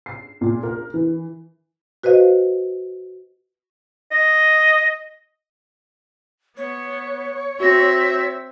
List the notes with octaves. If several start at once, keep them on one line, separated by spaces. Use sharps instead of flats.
C7
A#2
A#4
E3
F#4 B4 C5 D#5 F5
D#5
B3 C#5
C4 F#4 E5 A#6